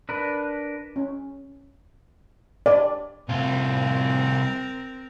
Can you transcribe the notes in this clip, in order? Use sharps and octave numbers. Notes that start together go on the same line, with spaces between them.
D4 A#4 B4
C#4
D5
C2 C4 F4 A#4